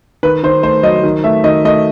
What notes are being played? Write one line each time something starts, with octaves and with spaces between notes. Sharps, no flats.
D#3 B4
D#3 C5
A3 C5
F#3 D#5
D#3
A3 E5
D#3 D#5
A3 D#5